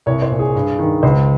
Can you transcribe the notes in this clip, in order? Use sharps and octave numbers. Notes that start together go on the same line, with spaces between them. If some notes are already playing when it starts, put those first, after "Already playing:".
C2 C#5
C5
A#2
G#4
G2
D#3
C#2 C5